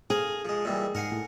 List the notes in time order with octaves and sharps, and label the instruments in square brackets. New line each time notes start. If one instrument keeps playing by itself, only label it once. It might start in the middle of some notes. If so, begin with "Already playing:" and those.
[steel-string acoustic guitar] G#4 [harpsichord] A#4 F5 G#5
[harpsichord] F3 G#3
[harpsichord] A#2 E3 G3 [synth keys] G#3
[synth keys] G#2 C7 [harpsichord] A#4 F#5 G#5
[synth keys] A2